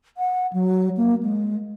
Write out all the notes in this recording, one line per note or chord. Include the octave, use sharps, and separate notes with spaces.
F#5
F#3
A#3
G#3